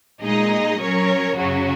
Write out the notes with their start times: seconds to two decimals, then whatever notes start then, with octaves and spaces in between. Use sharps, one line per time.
0.22 A#2 G#3 D#4 G#4 D#5
0.79 F#3 C#4 A#4 C#5
1.36 F#2 C#3 F#3 C#4 F#4